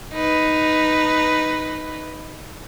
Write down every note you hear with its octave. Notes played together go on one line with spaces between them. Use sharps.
D#4 B4